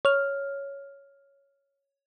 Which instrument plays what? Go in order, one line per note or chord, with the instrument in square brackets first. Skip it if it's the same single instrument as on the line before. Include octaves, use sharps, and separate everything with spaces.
[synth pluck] C#5 F6